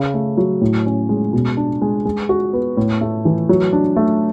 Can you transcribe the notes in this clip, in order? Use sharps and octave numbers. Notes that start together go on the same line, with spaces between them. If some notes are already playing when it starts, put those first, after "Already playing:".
Already playing: C#3
A3
F#3
A2
C#4
G#3
B2
D4
G#3
G#3
F#4
B3
A2
A3
E3
F#3
D4
A3